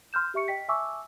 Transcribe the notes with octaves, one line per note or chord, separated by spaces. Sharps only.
C6 F6 G6 E7
G4 E5 C#6 C#7
D#5 G5 B6
E5 G#5 A5 C#6 D6 E6